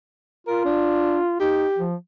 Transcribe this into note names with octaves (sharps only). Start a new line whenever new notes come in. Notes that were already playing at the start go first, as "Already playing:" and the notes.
F4 A#4
D4
D#4 G4
F3